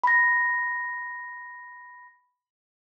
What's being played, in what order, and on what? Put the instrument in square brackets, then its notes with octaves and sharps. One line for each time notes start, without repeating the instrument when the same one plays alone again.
[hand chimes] B5 A#6